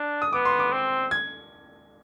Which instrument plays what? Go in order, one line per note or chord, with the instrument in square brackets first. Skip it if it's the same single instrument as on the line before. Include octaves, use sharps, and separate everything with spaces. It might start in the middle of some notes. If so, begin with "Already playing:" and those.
Already playing: [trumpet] D4
[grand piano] D#6
[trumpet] B3 [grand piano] D6
[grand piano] C6
D6
[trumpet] C4
[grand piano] G#6